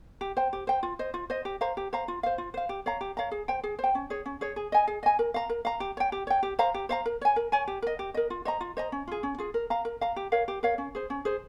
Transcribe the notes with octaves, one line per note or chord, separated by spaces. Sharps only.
G4
C5 G5
G4
C5 G5
F4
C5 D#5
F4
C5 D#5
G4
C5 F5 A#5
G4
C5 F5 A#5
F4
C5 F5
F4
C5 F5
G4
C#5 F5 A#5
G4
C#5 F5 A#5
G#4
C5 G5
G#4
C5 G5
C#4
G#4 C#5
C#4
G#4 C#5
G#4
D#5 G#5
G#4
D#5 G#5
A#4
F5 A#5
A#4
F5 A#5
G4
C#5 G5
G4
C#5 G5
G4
C5 F5 A#5
G4
C5 F5 A#5
A#4
C#5 G#5
A#4
C#5 G#5
G4
A#4 D#5
G4
A#4 D#5
F4
C5 D#5 A#5
F4
C5 D#5 A#5
C#4
F4 G#4
C#4
F4 G#4
A#4
F5 A#5
A#4
F5 A#5
G4
A#4 C#5 F5
G4
A#4 C#5 F5
C#4
G#4 C5
C#4
G#4 C5